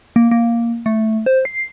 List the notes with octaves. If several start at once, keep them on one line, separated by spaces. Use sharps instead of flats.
A#3
A#3
A3
C5
C7